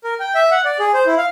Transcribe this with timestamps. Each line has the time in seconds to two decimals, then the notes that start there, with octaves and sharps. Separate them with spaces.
0.04 A#4
0.20 G5
0.35 E5
0.51 F#5
0.65 D5
0.80 G#4
0.94 C5
1.06 E4
1.18 F5